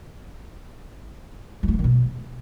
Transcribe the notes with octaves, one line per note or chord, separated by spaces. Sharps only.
F#3
A3
E3
D#3
B2